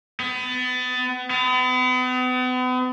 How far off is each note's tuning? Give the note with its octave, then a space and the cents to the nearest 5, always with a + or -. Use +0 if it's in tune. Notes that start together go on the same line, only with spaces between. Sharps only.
B3 +30
B3 +40